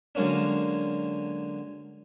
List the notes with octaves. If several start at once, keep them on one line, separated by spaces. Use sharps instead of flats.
D3 F#3 G#3 A#3 C#4 D4